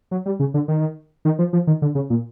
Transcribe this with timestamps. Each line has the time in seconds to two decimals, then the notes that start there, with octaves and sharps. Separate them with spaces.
0.11 F#3
0.26 G3
0.40 C#3
0.54 D3
0.68 D#3
1.25 D#3
1.39 F3
1.53 F3
1.67 D#3
1.82 D3
1.95 C#3
2.10 A#2